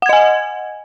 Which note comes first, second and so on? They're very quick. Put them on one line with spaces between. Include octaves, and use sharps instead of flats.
F#5 G#6 D#5 G#5